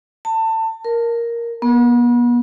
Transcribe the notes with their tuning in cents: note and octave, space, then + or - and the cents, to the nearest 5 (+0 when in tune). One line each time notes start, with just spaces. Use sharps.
A5 +25
A#4 +5
B3 -40